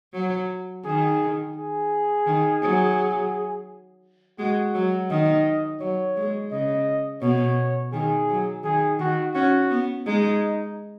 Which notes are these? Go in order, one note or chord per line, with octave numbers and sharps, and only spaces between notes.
F#3
D#3 G#4
G#4
D#3
F#3
G#3 F#4
F#3
D#3 D#5
F#3 C#5
G#3
C#3 D#5
B2 C#5
D#3 G#4
F#3
D#3 G#4
D#3 F#4
C#4 F#4
B3
G#3 D#4